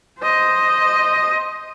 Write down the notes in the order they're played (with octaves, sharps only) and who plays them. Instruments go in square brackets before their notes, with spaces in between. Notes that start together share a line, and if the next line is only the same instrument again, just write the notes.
[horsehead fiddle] C5 D#5